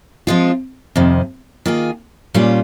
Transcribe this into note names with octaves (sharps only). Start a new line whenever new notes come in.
F3 G#3 C4 F4
F2 C3 D#3
D#3 A#3 F4 G#4
A#2 G3 C#4 F4